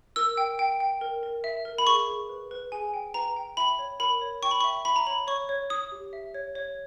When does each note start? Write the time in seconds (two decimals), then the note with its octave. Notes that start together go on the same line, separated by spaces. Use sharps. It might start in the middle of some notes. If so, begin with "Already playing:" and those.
0.16 A#4 E6
0.37 G5
0.59 G5
0.80 G5
1.01 A#4
1.23 A#4
1.44 E5
1.65 A#4
1.78 B5
1.87 G#4 C#6
2.08 G#4
2.29 B4
2.51 B4
2.72 G#4 G#5
2.94 G5
3.14 B4 A#5
3.36 G5
3.57 E5 B5
3.79 C#5
4.00 A#4 B5
4.21 C#5
4.43 G5 C#6
4.51 B5
4.61 E5 C#6
4.85 E5 B5
4.96 A#5
5.06 C#5 B5
5.27 C#5 C#6
5.49 C#5
5.70 C#5 D#6
5.92 G4
6.13 E5
6.34 C#5
6.55 C#5